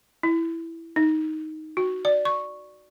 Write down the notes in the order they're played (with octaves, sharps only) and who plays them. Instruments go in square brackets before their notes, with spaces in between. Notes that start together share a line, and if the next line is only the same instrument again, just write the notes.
[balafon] E4
D#4
F#4
D5
C#6